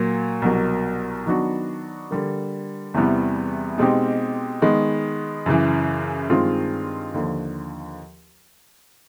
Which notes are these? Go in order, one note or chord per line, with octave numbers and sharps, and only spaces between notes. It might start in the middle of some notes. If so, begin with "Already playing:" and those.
Already playing: A#2 F#3 A#3
C2 B2 F#3 A#3
D#3 F#3 B3 D4 F#4
D3 G3 A#3
E2 C3 E3 G3 B3
B2 G#3 C4 D#4 G4
D#3 G#3 B3
F#2 C#3 E3
G2 D#3 G#3 C4 F4
D#2 D3 F3